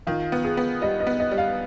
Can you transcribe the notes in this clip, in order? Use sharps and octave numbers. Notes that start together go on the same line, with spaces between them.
D#3 F4
B3
G#4
B3
G3 D#5
D#5
B3
D#5
G3
F5